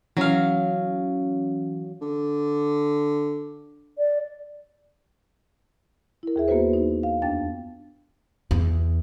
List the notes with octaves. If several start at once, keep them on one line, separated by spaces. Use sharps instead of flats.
E3 F#3 C#4 F5
D3
D5
E4 A#4
D#2 G#4 E5
A#3 B3 F#4 B4 C5
D#4
F5
F2 B3 D4 G5 A6
E2